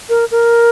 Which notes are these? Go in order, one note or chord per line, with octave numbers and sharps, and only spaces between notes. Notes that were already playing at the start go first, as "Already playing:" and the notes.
A#4
A#4